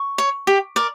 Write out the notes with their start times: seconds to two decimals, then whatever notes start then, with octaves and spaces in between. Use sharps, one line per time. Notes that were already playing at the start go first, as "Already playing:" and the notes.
Already playing: C#6
0.18 C#5
0.47 G4
0.76 A#4 D5